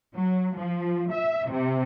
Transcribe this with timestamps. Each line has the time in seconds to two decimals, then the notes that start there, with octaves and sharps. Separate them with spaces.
0.14 F#3
0.57 F3
1.12 E5
1.48 C3